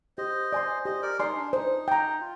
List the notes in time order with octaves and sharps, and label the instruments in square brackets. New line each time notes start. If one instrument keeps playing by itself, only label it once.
[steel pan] G4 [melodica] C5 D#5
[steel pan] D5 G#5 C6
[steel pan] G4 [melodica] C5 D#5
[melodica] A#4 D5
[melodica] D#4 [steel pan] D5 G#5 C6
[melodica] D4
[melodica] D#4 [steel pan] C5
[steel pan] G5 A#5
[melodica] F4